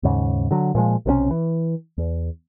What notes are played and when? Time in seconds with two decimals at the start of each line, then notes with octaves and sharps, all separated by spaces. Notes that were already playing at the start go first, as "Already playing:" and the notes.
0.03 D#2 G#2 C#3
0.51 D3 F#3
0.75 A#2 F3 G#3
1.06 B1 C3 G3 C#4
1.31 E3
1.98 E2